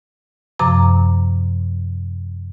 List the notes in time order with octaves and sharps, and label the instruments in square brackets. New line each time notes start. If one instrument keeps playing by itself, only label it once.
[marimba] F#2 C3 F3 A#5 D6